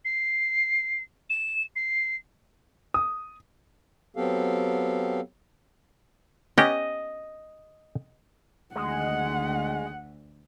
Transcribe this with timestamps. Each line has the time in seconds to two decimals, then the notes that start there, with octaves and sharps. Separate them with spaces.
0.04 C7
1.29 E7
1.75 C7
2.94 D#6
4.16 F#3 B3 C4 G4 A4 F5
6.58 B3 C#4 G4 D#5
8.75 D2 G#3 F#5